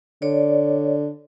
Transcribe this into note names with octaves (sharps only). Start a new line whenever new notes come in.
D3 C#5 D5